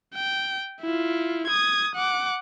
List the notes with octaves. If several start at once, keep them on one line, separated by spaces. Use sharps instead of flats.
G5
E4 F4
D#6 G#6
F#5 D6